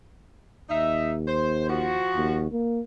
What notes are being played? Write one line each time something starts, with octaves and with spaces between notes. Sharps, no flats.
D#2 D#4 E5
C5
F3 F#4
D#2
A#3